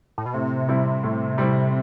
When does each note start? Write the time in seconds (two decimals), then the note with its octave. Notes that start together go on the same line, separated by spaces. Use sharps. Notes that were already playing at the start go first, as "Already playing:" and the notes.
0.18 A2
0.26 B2
0.34 A2 C3
0.69 G3 C4 E4
1.04 A2
1.38 G3 C4 E4